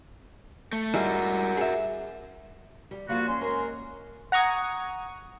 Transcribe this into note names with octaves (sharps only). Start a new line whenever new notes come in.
A3
G3 G#3 E4 F#4 A#4
G#4 E5
G3
F3 G3 A#3 F4 F#4
C#4 C6
G#2 A#4 D#5
F#5 A#5 C#6 D#6 G#6